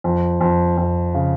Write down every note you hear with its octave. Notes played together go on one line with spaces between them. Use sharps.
F2
F2
F2
C#3